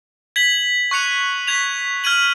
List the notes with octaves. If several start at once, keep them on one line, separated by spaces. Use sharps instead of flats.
G#6 B6 F#7
C#6 F#6 C#7 F7
G#6 B6 F7
F6 G#6 D#7 F#7